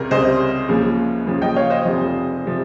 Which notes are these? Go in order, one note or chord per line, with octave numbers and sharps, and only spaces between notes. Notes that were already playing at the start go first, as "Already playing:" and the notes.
Already playing: C#2 C3 G3 A#4
C#2 C3 G3 C5 D#5
C#2 C#3 F3 A#3
C#2 C#3 F3 A#3
D#5 G5
C#5 F5
C5 D#5
F1 F2 C3 F3
C3 F3